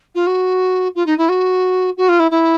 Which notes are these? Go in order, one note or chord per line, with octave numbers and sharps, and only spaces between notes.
F4
F#4
F4
D#4
E4
F#4
F#4
F4
E4
E4